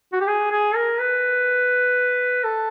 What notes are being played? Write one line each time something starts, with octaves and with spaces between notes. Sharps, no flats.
F#4
G4
G#4
G#4
A#4
B4
A4